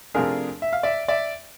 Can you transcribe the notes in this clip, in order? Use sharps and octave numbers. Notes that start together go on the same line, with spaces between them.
C3 F3 A3 D4 F4 G#4 A#4
E5
F5
D5 E5
D5 E5